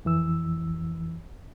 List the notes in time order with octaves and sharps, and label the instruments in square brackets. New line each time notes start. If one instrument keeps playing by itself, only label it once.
[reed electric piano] F2 E3 E6